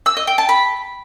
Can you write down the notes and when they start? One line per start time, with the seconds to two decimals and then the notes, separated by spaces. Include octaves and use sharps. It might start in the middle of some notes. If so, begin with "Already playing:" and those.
0.06 E6
0.17 D#5
0.27 G5
0.38 A5
0.49 B5